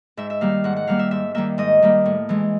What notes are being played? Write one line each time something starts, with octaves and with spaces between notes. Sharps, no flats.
G#2 E5
E5
D#3 G3 A#3 F5
G#2 F#5
F#5
D#3 G3 A#3 F5
E5
G#2 E5
D#3 G3 A#3 E5
G#2 D#5
D#3 G3 A#3
A2
E3 G#3